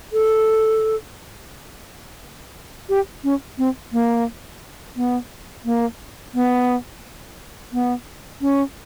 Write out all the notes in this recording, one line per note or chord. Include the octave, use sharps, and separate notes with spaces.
A4
G4
C#4
C4
A#3
B3
A#3
B3
B3
C#4